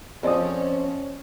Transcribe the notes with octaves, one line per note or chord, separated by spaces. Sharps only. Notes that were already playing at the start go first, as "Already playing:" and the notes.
F2 F3 C4 C#4 D5 D#6